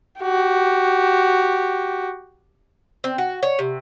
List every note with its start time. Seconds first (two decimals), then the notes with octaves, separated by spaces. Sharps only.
0.21 F#4 G4
3.04 C4
3.18 F#4
3.43 C#5
3.59 C3